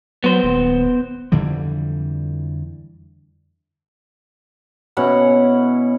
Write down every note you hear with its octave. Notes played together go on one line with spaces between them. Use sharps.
F#3 B3 C5
D#1
F2 D3 E3 G3
B2 C#4 E4 F#5